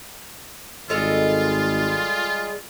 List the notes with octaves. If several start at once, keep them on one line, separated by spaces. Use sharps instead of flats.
G#1 G3 G#3 F4 G#4 A4 D#5 F5